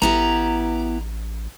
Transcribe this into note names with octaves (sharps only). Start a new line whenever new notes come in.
A1 B3 E4 G4 A#5